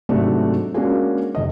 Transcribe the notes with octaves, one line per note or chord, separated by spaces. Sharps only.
G#2 C3 F#3 A3 D4 F#4
G#3 A#3 C#4 D4 F#4 G#4
F1 D#5